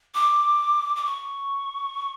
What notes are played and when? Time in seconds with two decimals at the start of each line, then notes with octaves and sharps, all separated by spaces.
0.15 D6
0.96 D6
1.05 C#6